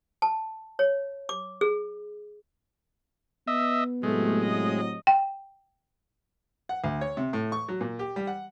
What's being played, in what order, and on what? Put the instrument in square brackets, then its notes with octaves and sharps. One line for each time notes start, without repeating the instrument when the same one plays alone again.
[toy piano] A5
C#5
D6
G#4
[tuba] B3 [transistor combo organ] D#5 E5
[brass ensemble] A2 C3 F#3 [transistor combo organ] G#3 [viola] A3
[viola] D#5
[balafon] G5
[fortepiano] F#5
D2
C#5
C3
A2
C#6
F#3
A#2
G4
G3
F#5